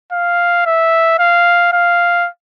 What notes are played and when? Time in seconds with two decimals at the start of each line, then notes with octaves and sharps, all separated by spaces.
0.13 F5
0.66 E5
1.19 F5
1.73 F5